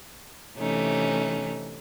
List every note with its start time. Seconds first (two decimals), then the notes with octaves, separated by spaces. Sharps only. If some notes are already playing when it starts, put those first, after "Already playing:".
0.57 C3 E3 A3 C#4 D#4